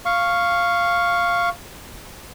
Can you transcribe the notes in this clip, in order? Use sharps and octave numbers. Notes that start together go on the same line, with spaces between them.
F5 C#6